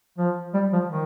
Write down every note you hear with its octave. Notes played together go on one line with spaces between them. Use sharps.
F3
G3
F3
D#3